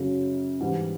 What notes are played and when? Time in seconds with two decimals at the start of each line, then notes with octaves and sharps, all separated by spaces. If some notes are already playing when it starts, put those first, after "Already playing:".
Already playing: F#2 C#3 F#3
0.61 G#2 E3 G3